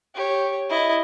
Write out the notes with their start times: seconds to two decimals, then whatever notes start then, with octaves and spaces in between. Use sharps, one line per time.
0.15 G4 C#5
0.70 E4 D#5